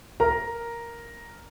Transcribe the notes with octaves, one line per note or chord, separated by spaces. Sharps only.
A#4 A#5